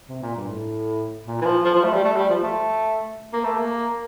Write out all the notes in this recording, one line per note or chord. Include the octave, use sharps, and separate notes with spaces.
C3
A#2
G2
A2
A#2
E3
F3
F3
F3
A3
G3
A3
G3
F3
A3
A#3
A3
A#3